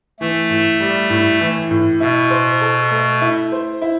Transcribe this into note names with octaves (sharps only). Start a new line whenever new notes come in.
E3 A3
A2
G3
A2
E3
A2
B2 E4
C5
A4
A3
E4
C5
E4